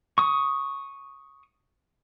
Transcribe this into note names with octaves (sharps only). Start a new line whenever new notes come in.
C#6 D#6